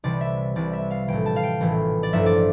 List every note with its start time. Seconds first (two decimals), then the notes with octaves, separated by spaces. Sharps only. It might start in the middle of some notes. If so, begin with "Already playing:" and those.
0.04 C2 C3 E3 D5
0.21 E5
0.56 C2 C3 E3 D5
0.73 E5
0.91 F5
1.08 A#1 A2 E3 G5
1.26 A5
1.36 F5
1.43 G5
1.61 A#1 A2 E3
2.03 D5
2.13 A1 G2 F3 E5
2.26 D5